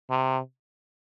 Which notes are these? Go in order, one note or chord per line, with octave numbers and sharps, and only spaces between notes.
C3